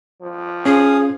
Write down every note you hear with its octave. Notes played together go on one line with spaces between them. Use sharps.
F3
C#4 G#4 F5 G#5 D#6